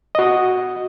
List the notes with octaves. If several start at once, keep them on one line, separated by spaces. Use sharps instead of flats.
F#4 D#5